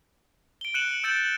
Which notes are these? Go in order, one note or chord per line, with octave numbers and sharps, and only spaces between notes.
D7 G7
F#6 C#7 D#7 E7 F#7
E6 G6 A6 D7 E7 F#7
G6